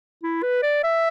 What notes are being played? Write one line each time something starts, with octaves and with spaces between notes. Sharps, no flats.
E4
B4
D5
E5